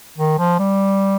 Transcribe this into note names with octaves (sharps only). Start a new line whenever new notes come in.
D#3
F3
G3